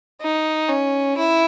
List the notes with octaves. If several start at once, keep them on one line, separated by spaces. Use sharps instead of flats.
D#4
C#4
E4